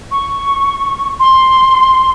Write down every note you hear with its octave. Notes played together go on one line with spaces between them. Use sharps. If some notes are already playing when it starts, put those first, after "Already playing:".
C#6
C6